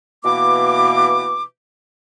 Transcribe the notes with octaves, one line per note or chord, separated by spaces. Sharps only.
B2 E3 A#3 D6